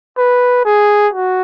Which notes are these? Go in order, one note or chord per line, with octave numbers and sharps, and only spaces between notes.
B4
G#4
F#4